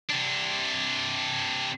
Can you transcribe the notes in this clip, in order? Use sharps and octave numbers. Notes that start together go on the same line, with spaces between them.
C3 D4